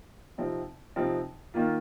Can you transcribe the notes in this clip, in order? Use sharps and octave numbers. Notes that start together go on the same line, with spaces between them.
C3 F3 C4 D#4
C3 F3 C4 D#4
D#3 A#3 F4